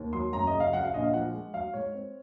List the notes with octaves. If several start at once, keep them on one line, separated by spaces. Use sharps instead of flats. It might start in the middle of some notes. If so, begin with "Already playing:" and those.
Already playing: D#2
F#3 C6
F#2 A#5
D#5
C#3
F5
F#3 F#5
F5
A#1 D#5
F5
F3 F#5
G#3
F#3 F5
G#2 C#5
C4